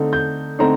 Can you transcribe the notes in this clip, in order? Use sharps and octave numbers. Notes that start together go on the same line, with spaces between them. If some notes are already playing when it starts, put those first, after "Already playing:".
Already playing: D3 A3 C4 D#4
G6
D3 A3 C4 D#4 A#5